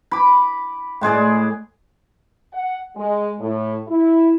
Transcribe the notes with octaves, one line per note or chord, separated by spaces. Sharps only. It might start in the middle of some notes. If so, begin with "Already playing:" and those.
B5 D6
A2 G#3 G#4 D5
F#5
G#3
A2
E4